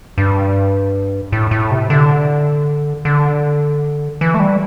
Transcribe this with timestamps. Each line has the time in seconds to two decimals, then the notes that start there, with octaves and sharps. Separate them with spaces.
0.18 G2
1.32 A2
1.51 A2
1.71 C3
1.90 D3
3.05 D3
4.21 E3
4.34 A3
4.40 G3